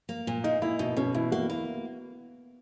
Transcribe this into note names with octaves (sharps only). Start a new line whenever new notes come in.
A#3
A#2
A#3 D#4
A#3 E4
B2 D#4
B2 C#4
E2 E4
A#3 F#4
A#3 E4